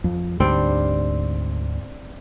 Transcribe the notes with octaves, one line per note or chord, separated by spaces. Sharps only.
F2
D2 G#2 D3 G3 C4 D4